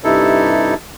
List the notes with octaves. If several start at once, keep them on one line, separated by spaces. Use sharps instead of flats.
G2 C3 D#4 E4 A4